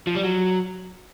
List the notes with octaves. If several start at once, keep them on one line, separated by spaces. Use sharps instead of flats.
F3
G3
F#3